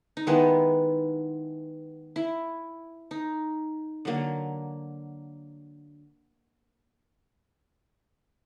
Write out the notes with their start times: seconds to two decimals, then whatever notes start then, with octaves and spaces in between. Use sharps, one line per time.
0.17 D#4
0.27 D#3 G#3 B3 E4
2.16 E4
3.11 D#4
4.05 D3 F#3 A#3